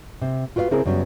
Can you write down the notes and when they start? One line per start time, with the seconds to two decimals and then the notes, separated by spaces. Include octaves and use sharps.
0.21 C3
0.56 F4 F#4 B4 D5 F5
0.71 C#3 C4 E4 G#4 A#4
0.86 F#2 C#3 F#3 G3 B3